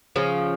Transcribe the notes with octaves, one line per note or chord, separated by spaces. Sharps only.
C#3 F3